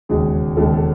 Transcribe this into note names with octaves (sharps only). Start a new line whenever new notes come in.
E1 D#2 C#3 G#3 G#4
E1 D#2 C#3 G#3 A4
A4